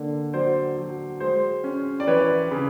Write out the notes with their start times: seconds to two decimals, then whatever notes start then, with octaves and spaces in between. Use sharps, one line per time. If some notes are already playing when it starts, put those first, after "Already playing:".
Already playing: D3 A#3
0.33 F#3 C5 D5
0.77 F#3
1.20 G#3 C5
1.64 C#4
2.00 D5
2.07 E3 B4 C#5
2.51 C#3